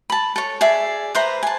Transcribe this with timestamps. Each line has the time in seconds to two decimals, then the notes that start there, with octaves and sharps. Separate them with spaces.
0.10 A5 B5
0.36 A4 C#5
0.61 G#4 D5 E5
1.15 B4 C5 E5 A#5
1.43 G#5 A5